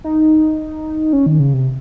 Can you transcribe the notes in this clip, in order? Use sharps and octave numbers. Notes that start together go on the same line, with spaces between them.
D#4
C#4
D#3
C#3
C3